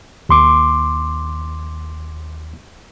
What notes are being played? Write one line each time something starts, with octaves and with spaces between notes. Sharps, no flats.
D#2 C6 D6